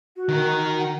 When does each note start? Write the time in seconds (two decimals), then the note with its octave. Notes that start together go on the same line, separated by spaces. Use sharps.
0.16 F#4
0.29 D#3 A#4
0.79 F#5